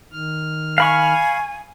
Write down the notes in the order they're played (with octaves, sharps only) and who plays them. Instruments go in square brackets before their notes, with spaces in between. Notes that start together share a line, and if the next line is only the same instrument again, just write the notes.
[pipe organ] D#3 F6
[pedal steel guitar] F5 B5 C#6 [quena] G#5